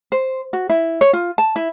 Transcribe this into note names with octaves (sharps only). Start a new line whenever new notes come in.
C5
F#4
E4
C#5
F4
A5
E4